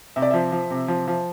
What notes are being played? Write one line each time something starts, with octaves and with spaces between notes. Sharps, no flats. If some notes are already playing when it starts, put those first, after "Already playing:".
C3 E5
D5
F3 E5
F3
C3
F3
F3